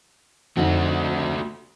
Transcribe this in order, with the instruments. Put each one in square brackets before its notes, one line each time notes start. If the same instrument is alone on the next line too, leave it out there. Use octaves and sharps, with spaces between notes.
[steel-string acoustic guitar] F2 D3 D#4 [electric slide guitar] A3 F#4